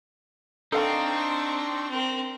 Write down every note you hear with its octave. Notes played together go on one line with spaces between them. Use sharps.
C4 D4 D#4 F4 A4 F5 G5 C#6
C4 A#4